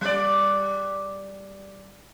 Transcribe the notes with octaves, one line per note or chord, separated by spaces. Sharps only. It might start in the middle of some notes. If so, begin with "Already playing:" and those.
G3 D5